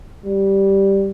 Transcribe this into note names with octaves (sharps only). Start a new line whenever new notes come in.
G3